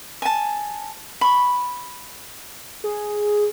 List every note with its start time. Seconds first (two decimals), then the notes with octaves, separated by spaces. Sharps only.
0.22 G#5 A5
1.21 B5 C#6
2.84 G#4